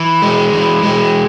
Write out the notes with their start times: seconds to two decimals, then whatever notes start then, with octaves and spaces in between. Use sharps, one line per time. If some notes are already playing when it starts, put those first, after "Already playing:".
Already playing: E3
0.22 G#3
0.53 E3
0.83 G#3